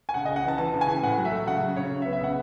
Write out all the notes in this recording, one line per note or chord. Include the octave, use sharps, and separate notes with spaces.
G#5
C#3 F#5
C#3 D#5
F#5
E3 A5
E3 A5
C#3
G#5
E3
A2 F#5
F#3
E5
A3
C#3 F#5
F#3
C#3 C#5
C#3
E5
B3
E5
C#3 F#5